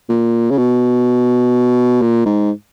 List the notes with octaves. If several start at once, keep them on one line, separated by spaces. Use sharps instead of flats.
A#2
C#3
B2
A#2
G#2